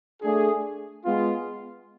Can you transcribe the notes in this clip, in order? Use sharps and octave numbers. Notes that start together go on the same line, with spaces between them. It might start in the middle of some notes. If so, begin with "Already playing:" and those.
A3 D4 G#4
G#3 B3 F4